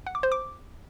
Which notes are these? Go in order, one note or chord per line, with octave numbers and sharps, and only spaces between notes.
F#5
D6
C5
D6